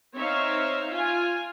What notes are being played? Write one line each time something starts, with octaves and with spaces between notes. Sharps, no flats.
C4 D#4 C#5 E5 F5
F4 G#5